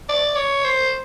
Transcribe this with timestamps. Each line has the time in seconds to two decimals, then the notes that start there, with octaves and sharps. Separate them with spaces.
0.09 D5
0.36 C#5
0.64 C5